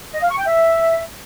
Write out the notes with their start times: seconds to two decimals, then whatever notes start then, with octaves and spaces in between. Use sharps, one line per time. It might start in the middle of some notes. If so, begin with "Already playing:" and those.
0.14 D#5
0.22 F5
0.30 C#6
0.38 G5
0.46 E5